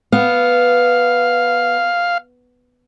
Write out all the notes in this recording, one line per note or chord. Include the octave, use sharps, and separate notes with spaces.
B3 F5